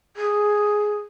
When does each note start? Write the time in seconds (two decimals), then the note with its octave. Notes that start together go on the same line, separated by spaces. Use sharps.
0.16 G#4